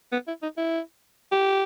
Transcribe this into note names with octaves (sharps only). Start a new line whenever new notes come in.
B3
E4
D#4
E4
G4